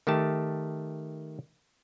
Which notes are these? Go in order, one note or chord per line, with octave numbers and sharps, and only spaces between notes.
D#3 A3 G4 A5